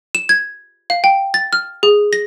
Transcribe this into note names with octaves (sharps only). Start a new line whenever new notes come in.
E7
G#6
F5
G5
A6
F6
G#4
A#6